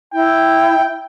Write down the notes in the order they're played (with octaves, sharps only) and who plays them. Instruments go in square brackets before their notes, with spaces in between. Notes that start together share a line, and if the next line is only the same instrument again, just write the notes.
[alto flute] E4 [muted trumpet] G5